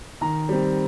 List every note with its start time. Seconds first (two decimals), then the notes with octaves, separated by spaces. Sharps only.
0.21 D#3 A#5
0.49 G3 C4